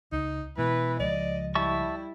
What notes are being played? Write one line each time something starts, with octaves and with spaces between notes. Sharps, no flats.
C#2 D#4
B2 E3 G#3 B4
C#2 F3 G#3 D5 D#5
G3 E4 E5 A5 C#6